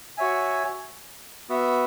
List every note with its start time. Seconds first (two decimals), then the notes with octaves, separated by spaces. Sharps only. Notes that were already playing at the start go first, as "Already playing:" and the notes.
0.17 F#4 C#5 E5 G#5
1.49 B3 F#4 E5